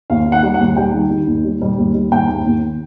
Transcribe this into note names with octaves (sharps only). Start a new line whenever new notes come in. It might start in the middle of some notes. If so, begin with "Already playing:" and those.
D#2 F5
D#3
F#5
G3
F#5
D#2
G3 G5
D#3
D#3
D#2
G3
G3
D#2
G3
D#2 G5
D#2
D#2